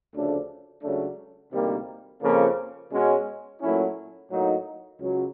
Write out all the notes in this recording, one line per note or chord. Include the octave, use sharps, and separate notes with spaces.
D2 C#3 F3 A3 D4
C#2 C#3 F#3 A3 D4
D2 C3 D#3 G3 A#3
F2 C#3 F3 A#3
B2 G#3 C#4 F#4
A#2 F#3 A3 C#4 E4
A2 F#3 A#3 D#4 F#4
C#2 C#3 F#3